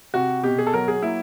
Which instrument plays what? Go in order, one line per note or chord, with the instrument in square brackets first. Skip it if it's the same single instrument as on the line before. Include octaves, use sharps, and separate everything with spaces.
[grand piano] C3 F#4
B2 G4
G#4
A4
F#3 A#4
G#4
A#3 E4